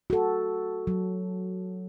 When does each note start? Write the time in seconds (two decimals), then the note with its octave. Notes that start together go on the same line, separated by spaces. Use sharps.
0.10 F#4 A4
0.87 F#3